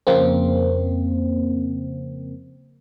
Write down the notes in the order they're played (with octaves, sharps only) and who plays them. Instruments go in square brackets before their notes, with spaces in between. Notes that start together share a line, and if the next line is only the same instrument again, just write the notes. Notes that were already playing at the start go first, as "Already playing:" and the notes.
[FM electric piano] F2 C#3 A#3 C4